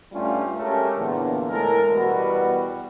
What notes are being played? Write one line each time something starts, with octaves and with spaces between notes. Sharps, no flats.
G2 G3 A3 C#4 F4
G#3 A3 C#4 G4 A4 A#4
E2 A#2 D3
A2 G#3 A4 A#4
E2 B2 G3 F#4 B4